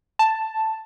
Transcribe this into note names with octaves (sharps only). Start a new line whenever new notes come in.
A5